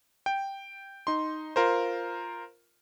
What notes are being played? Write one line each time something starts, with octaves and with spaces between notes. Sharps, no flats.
G5
D#4 C6
F4 A#4 C5